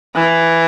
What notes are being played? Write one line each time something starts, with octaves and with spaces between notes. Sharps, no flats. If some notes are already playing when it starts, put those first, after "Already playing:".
E3